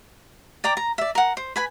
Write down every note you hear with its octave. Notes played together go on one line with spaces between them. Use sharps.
D5 G5 A#5 D6
A#5
D5 E5
A#4 F#5
C5
B4 G#5 B5